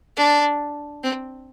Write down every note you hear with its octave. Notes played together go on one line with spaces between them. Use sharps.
D4
C4